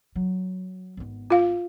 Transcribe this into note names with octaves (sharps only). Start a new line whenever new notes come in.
F#3
G#1 B3
F4 F5